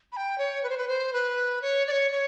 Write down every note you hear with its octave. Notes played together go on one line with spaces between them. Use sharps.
B5
G5
C#5
B4
C5
B4
C5
B4
C#5
D5
C#5
C#5